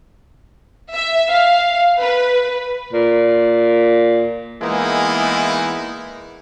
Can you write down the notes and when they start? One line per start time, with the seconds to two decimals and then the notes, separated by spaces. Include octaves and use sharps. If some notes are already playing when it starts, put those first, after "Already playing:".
0.94 E5
1.30 F5
2.01 B4
2.93 A#2
4.62 E3 G#3 A#3 B3 D#4 E4